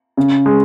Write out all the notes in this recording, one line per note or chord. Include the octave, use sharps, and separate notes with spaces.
C#3
G#3